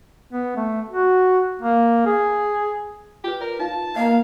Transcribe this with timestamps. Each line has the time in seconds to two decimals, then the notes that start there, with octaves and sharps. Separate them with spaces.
0.33 B3
0.56 A3
0.89 F#4
1.62 A#3
2.06 G#4
3.24 F4 G4 B4
3.41 A#4 D5
3.59 D#4 F4 F5 A5
3.96 A#3 D#5 F5 F#5 A#5